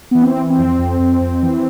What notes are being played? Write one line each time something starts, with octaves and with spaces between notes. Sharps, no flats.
E3 B3
C4
E3
C4
F2
F2
F2
F2
E3